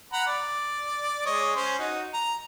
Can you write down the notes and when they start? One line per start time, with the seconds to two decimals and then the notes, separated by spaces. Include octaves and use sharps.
0.13 F#5 A#5 B5
0.27 D5
1.25 G#3 C#5 D#5
1.56 C#4 C5
1.79 D#4 F#4
2.14 A#5